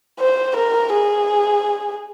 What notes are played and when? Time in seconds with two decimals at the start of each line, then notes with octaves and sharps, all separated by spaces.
0.20 C5
0.57 A#4
0.93 G#4